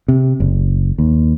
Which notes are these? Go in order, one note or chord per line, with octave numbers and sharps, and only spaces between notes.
C3
F#1
D#2